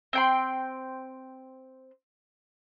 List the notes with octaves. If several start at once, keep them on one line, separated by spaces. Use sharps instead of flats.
C4 G5 C6